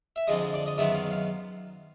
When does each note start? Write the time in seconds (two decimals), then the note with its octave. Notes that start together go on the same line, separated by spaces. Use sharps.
0.16 E5
0.27 F2 D3 F3 G#3 D#5
0.54 D5
0.66 D#5
0.78 F#2 D#3 G#3 B3 E5
0.95 F5
1.11 F5